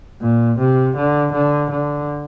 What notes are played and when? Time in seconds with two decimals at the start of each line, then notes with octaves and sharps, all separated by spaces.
0.21 A#2
0.59 C3
0.96 D3
1.33 D3
1.71 D3